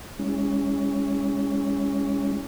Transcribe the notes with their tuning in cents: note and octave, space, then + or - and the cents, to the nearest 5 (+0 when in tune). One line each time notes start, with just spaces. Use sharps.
G#3 -30 C#4 +15 E4 -20